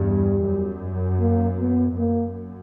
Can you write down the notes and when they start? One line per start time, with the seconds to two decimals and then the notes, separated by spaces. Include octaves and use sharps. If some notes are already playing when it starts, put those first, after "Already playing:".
Already playing: E2 G2 G3
0.43 F#2
1.20 A#3
1.59 B3
1.97 F#2 A#3